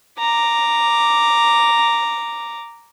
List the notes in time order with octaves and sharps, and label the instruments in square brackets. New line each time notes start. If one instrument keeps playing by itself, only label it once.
[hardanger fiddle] A#5 D6